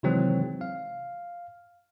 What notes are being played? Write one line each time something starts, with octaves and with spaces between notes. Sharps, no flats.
C3 D#3 E3 F#3 G#3 C4
F5